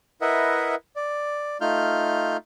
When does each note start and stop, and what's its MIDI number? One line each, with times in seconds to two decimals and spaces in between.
0.21 0.75 64
0.21 0.75 70
0.21 0.75 71
0.21 0.75 75
0.21 0.75 76
0.21 0.75 78
0.96 1.58 74
1.61 2.37 57
1.61 2.37 63
1.61 2.37 65
1.61 2.37 89
1.61 2.37 91